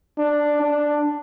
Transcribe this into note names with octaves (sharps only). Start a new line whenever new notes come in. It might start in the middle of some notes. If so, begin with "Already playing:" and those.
D4
D4